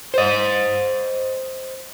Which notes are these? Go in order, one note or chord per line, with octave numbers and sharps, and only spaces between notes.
C5 D#5